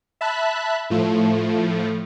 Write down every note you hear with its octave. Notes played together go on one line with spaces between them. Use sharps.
E5 A5 B5 F#6
A2 F3 A3